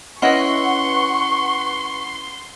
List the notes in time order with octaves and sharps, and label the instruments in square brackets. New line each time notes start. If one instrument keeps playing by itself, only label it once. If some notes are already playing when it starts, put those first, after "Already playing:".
[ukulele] C#4 E4 D#5 [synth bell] B4 F#5 [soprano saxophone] C6 [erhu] C#6